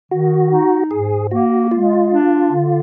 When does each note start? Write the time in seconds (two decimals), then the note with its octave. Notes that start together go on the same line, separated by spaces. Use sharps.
0.11 D#3 F#4
0.51 D#4
0.91 G#2 G#4
1.31 A#3 F#4
1.71 G#3 F4
2.11 D4
2.51 D3